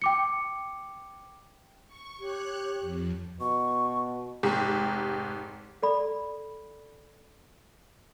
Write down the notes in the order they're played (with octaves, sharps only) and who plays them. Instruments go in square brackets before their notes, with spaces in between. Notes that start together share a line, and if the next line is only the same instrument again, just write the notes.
[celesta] G5 D6 C#7
[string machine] C#6
[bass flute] G4 [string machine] C#5 F#6
[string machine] F2
[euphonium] B2 [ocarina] C#6
[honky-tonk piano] F1 G#2 G4
[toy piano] A4 D5 B5